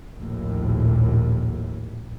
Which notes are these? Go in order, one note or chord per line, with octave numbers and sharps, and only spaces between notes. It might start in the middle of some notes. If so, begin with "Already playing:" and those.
A#1 D#2 A2